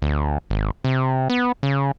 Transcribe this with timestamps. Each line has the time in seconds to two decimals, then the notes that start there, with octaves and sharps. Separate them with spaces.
0.02 D2
0.50 G#1
0.84 C3
1.30 B3
1.63 C#3